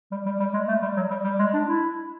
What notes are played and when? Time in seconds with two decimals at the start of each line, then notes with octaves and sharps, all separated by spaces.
0.11 G3
0.26 G3
0.40 G3
0.54 G#3
0.68 A3
0.82 G3
0.96 F#3
1.10 G3
1.24 G3
1.39 G#3
1.53 D4
1.67 E4